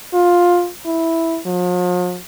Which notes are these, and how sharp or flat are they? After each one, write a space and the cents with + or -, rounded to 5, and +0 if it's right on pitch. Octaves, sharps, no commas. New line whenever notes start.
F4 +10
E4 -5
F3 +45